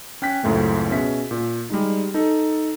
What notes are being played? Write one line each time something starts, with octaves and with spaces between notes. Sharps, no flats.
C#4 G5 F#6 B6
C#2 F#2 A2 A3 C4
B2 C#4 G#4 E5 B6
A#2
G3 G#3 D#4
D#4 A4